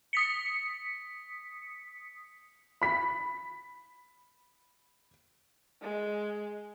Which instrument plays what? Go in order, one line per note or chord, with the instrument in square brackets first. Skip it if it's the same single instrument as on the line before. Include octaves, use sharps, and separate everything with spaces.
[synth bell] D#6 B6 C#7
[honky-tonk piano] B5 B6
[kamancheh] G#3